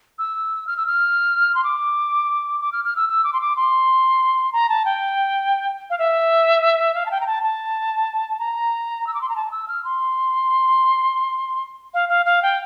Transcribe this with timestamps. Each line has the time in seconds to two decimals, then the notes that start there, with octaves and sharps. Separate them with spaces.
0.19 E6
0.67 F6
0.77 E6
0.86 F6
1.55 C6
1.64 D6
2.60 D6
2.72 F6
2.84 F6
2.96 E6
3.09 E6
3.24 D6
3.33 C6
3.41 D6
3.56 C6
4.53 A#5
4.69 A5
4.85 G5
5.90 F5
5.99 E5
6.94 F5
7.06 A5
7.11 G5
7.21 A#5
7.27 A5
7.43 A5
8.39 A#5
9.07 E6
9.14 D6
9.21 C6
9.29 A#5
9.36 A5
9.51 E6
9.68 F6
9.84 C6
11.94 F5
12.09 F5
12.25 F5
12.42 G5